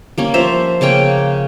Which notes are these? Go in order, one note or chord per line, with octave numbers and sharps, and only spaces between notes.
G3 A#3 C#4
F3 C5 E5 A#5
C#3 A#3 C#4 G5